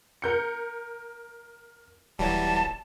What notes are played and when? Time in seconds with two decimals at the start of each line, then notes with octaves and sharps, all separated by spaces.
0.22 A#4 G6 C#7
2.19 D#1 E3 F#3 G3 A5